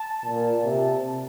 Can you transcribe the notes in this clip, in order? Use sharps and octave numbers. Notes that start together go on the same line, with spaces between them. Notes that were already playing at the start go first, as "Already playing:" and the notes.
Already playing: A5
A#2
C3